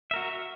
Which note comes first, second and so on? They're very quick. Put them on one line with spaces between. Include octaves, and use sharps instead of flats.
E5 A#4 F#4